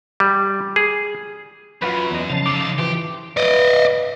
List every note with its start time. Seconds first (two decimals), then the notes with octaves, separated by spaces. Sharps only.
0.20 G3
0.76 G#4
1.82 F#2 F4 F#4 B4
2.11 E2 D#5
2.30 C#3 F3 A5
2.46 D#3 A4 D6
2.79 E3 F3 G4
3.37 B4 D5 D#5